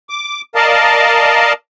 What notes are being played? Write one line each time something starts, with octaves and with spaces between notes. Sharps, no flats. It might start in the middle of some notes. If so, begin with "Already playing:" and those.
D6
A#4 D5 D#5 F5 A5